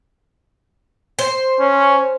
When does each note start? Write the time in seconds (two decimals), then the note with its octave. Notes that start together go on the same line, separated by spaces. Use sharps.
1.19 C5
1.60 C#4